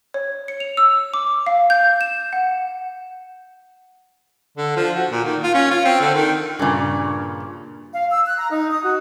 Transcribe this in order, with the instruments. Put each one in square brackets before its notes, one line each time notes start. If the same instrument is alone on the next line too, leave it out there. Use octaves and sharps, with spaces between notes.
[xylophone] C#5
C#7
F7
E6
D6
F5
G6
E7
F#5
[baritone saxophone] D3
F3
F#4
A#2
D#3
F4
C#4
F4
C4
D3
D#3
[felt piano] G2 [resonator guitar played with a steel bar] A#2 C#3
[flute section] F5
E6
F#6
A#5
D#4
D#6
F#4